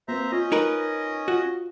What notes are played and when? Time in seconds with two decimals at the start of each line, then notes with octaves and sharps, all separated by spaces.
0.08 A#3 C4 B4 C5 E5 A#5
0.32 C#4 F4 D#5
0.52 D#4 A#4 B4
1.28 F4 F#4